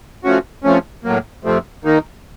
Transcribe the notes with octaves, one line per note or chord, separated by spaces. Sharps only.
F3 A3 C#4 F#4
C3 F3 A3 C#4
A2 F#3 A#3
F2 C3 F3 A3 C4
D#3 A#3 D#4